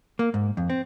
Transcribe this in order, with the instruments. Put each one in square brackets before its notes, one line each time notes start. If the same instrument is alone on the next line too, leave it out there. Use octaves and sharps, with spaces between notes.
[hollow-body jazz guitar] A#3
G#2
F2
C4